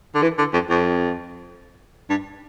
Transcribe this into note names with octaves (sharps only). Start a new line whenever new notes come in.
D3
E3
D3
F2
F2
G2